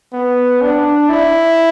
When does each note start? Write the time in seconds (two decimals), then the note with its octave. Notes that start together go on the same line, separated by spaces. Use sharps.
0.13 B3
0.62 D4
1.09 E4